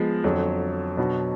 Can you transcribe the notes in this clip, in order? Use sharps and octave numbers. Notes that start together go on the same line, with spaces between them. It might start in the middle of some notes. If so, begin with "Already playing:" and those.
Already playing: F3 G#3 B3
F2 D3 F#3
B2 F#3 B3 D4 F#4